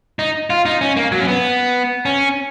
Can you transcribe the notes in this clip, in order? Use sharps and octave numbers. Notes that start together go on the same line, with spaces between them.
D#4
F4
D#4
C#4
A#3
F#3
C#4
B3
C#4